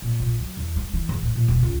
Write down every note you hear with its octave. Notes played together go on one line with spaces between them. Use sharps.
A#2
A#1
F#3
E2
G#3
E3
E2
A2
A#2
E1
C#2